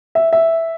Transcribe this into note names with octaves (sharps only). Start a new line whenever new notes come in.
E5
E5